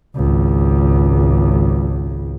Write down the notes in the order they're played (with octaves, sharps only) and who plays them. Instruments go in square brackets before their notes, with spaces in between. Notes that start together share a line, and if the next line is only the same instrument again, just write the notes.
[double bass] G#1 C#2